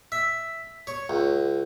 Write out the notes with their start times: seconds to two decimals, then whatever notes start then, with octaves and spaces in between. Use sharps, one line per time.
0.12 E5
0.87 C#5
1.10 C#2